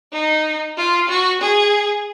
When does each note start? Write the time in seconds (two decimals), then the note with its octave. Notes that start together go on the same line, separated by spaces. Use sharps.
0.13 D#4
0.78 F4
1.09 F#4
1.41 G#4